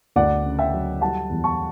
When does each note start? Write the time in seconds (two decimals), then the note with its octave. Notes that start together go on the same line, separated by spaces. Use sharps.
0.16 D2 D5 F#5
0.45 C#3
0.59 E5 G5
0.74 F#3
1.01 G3 F#5 A5
1.29 E2
1.44 A5 C#6